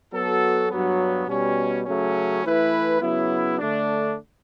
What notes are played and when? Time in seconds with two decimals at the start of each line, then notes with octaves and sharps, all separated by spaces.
0.12 F#3 B3 F#4 A4
0.71 G2 F#3 B3
1.27 B2 G3 C#4
1.85 C#3 F#3 A3 C#4
2.43 E3 A3 E4 B4
3.01 C#3 F#3 B3 E4
3.58 D3 A3 D4